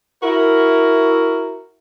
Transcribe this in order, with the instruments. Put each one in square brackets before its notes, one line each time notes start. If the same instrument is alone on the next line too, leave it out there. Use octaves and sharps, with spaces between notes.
[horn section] E4 F#4 A#4